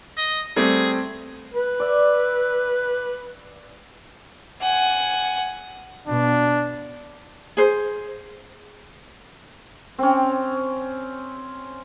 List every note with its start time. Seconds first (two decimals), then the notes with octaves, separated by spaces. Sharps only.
0.17 D#5
0.56 G3 A3 C4 G#4
1.53 B4
1.80 D5 E5
4.62 F#5 G#5
6.08 B2 D4
7.57 G#4 C5
9.98 C4 C#4